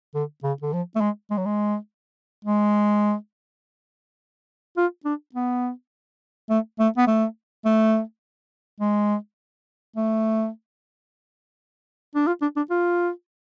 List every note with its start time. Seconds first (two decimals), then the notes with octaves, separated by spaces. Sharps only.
0.14 D3
0.43 C#3
0.62 D3
0.73 F3
0.95 A3
1.01 G#3
1.31 G#3
1.37 F#3
1.45 G#3
2.45 G#3
4.77 F4
5.05 D4
5.34 B3
6.50 A3
6.79 A3
6.97 B3
7.07 A3
7.65 A3
8.80 G#3
9.96 A3
12.15 D4
12.27 F4
12.42 D4
12.56 D4
12.70 F4